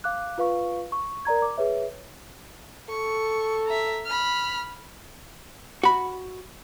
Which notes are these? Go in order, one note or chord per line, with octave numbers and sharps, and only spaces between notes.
F5 D6 F#6
F4 B4 F5 C#6
C#6
A#4 D5 A#5 G#6
D6
G#4 B4 C#5 E5
A4 C#6
E5 A#5
B5 F6
F#4 B5